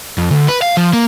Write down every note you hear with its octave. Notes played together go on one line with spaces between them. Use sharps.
F2
D2
B4
F5
F3
A#3